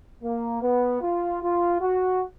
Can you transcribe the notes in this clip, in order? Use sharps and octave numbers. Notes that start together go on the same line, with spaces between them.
A#3
B3
F4
F4
F#4